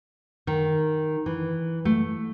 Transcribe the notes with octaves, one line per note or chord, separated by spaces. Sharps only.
D#3
E3
A3